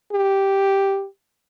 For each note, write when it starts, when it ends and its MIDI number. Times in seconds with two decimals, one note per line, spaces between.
0.12 1.06 67